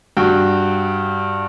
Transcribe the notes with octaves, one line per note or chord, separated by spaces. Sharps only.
G2 F#4 G5